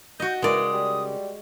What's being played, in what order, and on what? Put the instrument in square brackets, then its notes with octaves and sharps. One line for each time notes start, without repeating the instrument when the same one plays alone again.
[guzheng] F#4 D#5 [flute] G6
[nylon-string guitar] C#3 A#4 [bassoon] E3 [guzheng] G#3 D5 [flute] D#6
[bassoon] G3